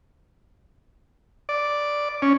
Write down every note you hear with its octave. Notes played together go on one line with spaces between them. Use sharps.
D5
C#4